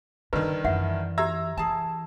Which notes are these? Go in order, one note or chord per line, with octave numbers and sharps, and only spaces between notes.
G2 D3 D#3 B4
F#2 E3 E5 F#5
G4 E5 A#5 E6 G#6
E3 G#4 A5